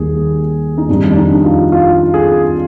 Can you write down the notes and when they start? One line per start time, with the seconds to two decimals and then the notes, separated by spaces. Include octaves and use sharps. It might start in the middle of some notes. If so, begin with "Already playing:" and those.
Already playing: D#2 D#3 G3 G#4
0.78 D#4
0.89 F2 D#3 G3 D4
1.11 D4
1.17 D#4
1.44 F4
1.72 F4
2.14 G#4